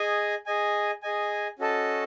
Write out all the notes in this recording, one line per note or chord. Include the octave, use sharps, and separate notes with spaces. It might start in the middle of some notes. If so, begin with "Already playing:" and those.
Already playing: G#4 D#5 G#5
G#4 D#5 G#5
G#4 D#5 G#5
C#4 F#4 A4 D#5 A5